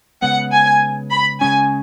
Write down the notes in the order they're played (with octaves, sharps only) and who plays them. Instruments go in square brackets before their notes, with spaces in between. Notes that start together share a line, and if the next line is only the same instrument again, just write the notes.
[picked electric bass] C#3 G#3 B3 [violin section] F#5
[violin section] G#5
B5
[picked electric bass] C#3 G#3 C#4 [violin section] G#5